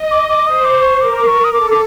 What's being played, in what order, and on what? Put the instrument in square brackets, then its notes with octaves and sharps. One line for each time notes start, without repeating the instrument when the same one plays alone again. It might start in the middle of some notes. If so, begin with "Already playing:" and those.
Already playing: [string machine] D#5
[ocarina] D6
D6
[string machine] C5 [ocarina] D#6
[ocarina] D6
C#6
[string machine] A#4 [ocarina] D6
[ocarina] D6
C#6
D#6
[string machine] A4 [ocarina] D6
[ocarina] D6